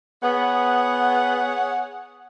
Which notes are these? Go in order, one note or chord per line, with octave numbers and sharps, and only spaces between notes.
B3 G#4 C#5 F#5